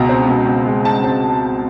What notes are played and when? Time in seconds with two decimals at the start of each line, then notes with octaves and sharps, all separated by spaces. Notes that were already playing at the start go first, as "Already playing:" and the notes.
Already playing: C#2 B2 A#5
0.09 C4
0.28 B2
0.47 B2
0.66 G#3
0.85 G#3 A5
1.04 C4